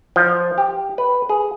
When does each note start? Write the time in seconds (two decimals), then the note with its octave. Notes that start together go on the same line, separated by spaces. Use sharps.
0.16 F3
0.58 G4
0.98 B4
1.29 G#4